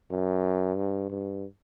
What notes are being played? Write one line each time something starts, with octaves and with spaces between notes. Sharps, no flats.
F#2
G2
G2